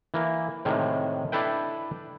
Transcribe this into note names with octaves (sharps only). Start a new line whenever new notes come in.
E3 A#3
A2 C3 D#3 G#3
D4 E4 A4 B4 G5